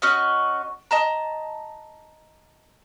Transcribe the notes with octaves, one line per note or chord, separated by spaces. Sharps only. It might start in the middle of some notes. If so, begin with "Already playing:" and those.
C#4 F#4 D#5
D#5 A5 A#5